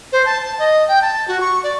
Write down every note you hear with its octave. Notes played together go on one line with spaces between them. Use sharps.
C5
A5
A5
D#5
G5
A5
F#4
C#6
D5